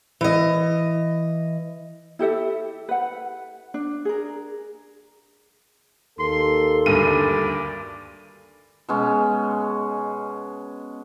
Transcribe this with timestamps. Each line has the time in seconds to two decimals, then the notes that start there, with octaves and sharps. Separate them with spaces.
0.21 E3 D#5
2.19 E4 G4 A4 E5
2.89 B4 F#5
3.74 D4
4.05 G#4 A#4
6.19 D#2 A#3 A4 C6
6.86 D2 G2 D5 D#7
8.89 B2 G#3 C#4